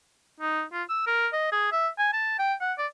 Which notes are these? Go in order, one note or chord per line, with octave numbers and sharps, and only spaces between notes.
D#4
F4
E6
A#4
D#5
G#4
E5
G#5
A5
G5
F#5
D5